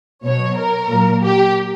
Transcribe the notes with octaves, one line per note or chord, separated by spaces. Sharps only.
B2 F#3 C#5
A#4
A#2 F#3
G4